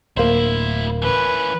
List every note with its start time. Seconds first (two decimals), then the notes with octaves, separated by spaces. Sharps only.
0.17 D1 D2 A#3 E4 C5
1.03 E3 C#4 B4